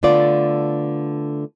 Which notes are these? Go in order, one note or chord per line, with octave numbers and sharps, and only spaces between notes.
D3 A3 B3 F4 D5